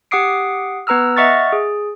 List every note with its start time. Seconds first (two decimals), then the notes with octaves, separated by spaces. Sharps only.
0.11 G4 F#5 D6 D#6 C7 D7
0.87 B3 B4 A#5 E6 F6
1.17 D#5 E5 F#5 C#6 F6 A6
1.52 G#4